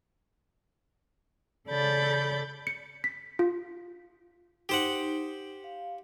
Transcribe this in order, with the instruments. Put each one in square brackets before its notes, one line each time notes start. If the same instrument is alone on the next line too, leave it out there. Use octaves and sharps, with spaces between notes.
[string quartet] C#3 A4 D5 B5 G6 A6
[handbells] C#7
B6
F4
[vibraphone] D#4 [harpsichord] G4 C5 F#5
[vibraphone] F5